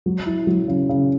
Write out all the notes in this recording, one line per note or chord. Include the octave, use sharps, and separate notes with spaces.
F#3
E4
F#3
C#3
C#3